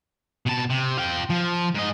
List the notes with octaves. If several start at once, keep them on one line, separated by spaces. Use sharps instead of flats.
B2 A5
C3
F4 G5
F3
G#2 D#5